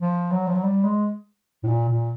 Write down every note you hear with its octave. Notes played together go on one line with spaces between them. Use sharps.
F3
F#3
F3
F#3
G3
G#3
A2
A#2
A#2